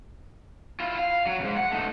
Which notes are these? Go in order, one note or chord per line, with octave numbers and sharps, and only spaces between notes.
E4 F4
F5
F#3
F2 G#2
F#5
A3 D#4